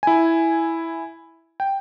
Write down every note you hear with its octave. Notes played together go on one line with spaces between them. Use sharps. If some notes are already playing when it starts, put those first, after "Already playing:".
E4 G#5
G5